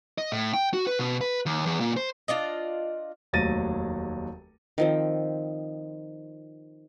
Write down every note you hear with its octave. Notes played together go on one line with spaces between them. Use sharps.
D#5
A2
G5
F#4
B4
B2
B4
D#2
E2
A#2
C5
D4 F4 D5 D#5
F1 D#2 F#3 A6 A#6 D#7
D#3 F3 C4